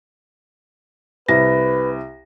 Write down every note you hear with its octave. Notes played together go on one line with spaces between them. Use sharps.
C2 B4 A#6